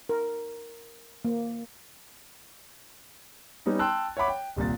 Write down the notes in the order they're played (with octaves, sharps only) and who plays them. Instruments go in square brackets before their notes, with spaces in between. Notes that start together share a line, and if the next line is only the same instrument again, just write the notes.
[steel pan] A#4
A#3
[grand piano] G3 B3 C#4 D#4
G5 A5 C6 E6 F#6
C#5 E5 F#5 B5 D6
G5
D#1 C2 A#2 A6